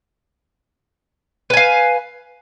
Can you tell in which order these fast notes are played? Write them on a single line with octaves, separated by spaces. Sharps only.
B4 G#5 F5